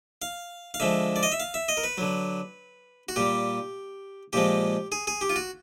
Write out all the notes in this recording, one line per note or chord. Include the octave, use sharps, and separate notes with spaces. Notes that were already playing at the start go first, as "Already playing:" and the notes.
F5
F5
D3 F3 G#3 E5
D5
D#5
E5
F5
E5
D#5
A#4
B4
D3 F#3
F#4
A#2 G3 G4
A#2 F3 G#3 G4
G#4
G#4
G4
F4
F#4